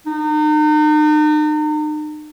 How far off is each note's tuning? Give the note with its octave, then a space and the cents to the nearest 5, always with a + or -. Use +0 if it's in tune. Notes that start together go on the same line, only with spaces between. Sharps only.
D#4 -40